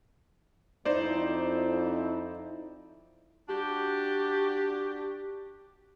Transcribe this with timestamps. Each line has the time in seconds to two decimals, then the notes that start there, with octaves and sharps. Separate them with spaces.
0.85 F2 D#4 E4 C5 D5
3.49 D4 F#4 G4